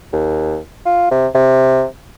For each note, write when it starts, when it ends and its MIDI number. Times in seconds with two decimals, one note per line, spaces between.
0.13 0.58 39
0.86 1.11 65
1.11 1.27 48
1.35 1.85 48